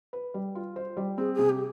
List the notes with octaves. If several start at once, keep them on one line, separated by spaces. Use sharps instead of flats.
B4
G3
F4
C5
G3
C4 G#4
C3 G#4
G4